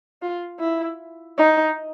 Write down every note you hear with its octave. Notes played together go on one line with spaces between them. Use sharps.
F4
E4
D#4